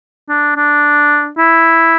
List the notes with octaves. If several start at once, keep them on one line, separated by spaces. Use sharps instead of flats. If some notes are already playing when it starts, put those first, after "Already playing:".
D4
D4
E4